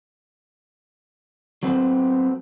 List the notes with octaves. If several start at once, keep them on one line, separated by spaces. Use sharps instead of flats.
F#3 B3 C4